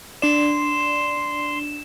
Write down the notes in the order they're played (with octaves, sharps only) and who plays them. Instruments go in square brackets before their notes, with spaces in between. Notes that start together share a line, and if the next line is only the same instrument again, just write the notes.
[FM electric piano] D4 D5 [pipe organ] C6 [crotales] E7